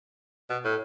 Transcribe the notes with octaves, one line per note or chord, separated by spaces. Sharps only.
B2
A2